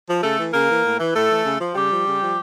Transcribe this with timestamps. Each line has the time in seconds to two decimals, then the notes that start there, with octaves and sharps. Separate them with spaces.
0.08 F3
0.22 C#3 A3 A4
0.39 E3
0.53 C#3 A#3 A#4
0.69 E3
0.84 A2
0.99 E3
1.14 A2 A3 A4
1.30 E3
1.44 C#3
1.60 F3
1.75 C#3 G3 G4
1.91 F3
2.07 C#3
2.22 F3